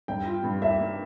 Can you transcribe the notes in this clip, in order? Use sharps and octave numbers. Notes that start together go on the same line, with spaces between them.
G2 G5
F4
G2
A#3 E5
A#3